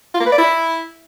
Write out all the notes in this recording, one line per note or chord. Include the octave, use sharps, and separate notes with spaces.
F4
A#3
B4
D5
E4